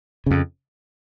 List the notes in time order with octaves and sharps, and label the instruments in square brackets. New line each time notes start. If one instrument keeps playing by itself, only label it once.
[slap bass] F2 C#3